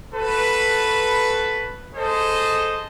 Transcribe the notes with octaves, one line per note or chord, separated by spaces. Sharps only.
F#4 A4 B4
G#4 A4 C5 D#5